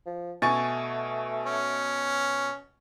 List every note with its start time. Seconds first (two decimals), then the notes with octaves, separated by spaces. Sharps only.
0.06 F3
0.42 B2 A3 G#5 C#6 A6
1.46 C#4